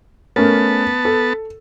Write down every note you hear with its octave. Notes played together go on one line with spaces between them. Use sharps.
A3 B3 C#4 A#4 A5
A4